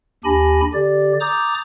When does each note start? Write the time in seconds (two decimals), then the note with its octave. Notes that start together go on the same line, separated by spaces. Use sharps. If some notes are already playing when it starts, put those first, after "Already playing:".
0.24 D#2 D4 G4 G#5 B5 A#6
0.73 D3 G4 D5 A6
1.20 A#5 D6 D#6 G6 A6